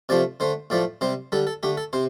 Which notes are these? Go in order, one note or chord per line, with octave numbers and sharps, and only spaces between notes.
C3 F3 A3 D5
D3 A3 C5
A2 F3 A3 D5
C3 G3 C5
D3 G3 A4
A4
D3 A3 G4
A4
C3 C5